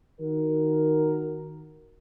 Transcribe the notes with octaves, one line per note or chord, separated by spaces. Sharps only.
D#3 F#4 A#4